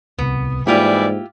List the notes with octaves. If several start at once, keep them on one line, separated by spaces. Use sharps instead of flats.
D1 C2 C3 B3
G#2 E3 G3 A#3 E4 F4 G4 D5